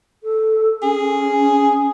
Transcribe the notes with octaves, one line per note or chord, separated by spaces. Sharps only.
A4
C#4 G#4